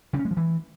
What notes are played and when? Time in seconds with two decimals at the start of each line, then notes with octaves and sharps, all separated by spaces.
0.13 C#3
0.19 C#4
0.25 G#3
0.31 F3
0.37 E3